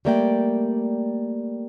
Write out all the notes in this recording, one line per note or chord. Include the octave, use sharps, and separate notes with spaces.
G3 A3 A#3 D5 F5 G5